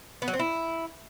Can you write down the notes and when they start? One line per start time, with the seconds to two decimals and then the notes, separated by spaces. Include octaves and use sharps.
0.22 B3
0.28 F#3
0.34 C4
0.39 E4